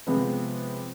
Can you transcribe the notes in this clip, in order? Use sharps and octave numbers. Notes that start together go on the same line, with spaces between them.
C3 F3 G#3 B3 C4 B4